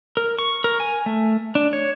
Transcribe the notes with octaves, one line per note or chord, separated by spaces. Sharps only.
A#4
C#6
A#4
G#5
A3
D4
C#5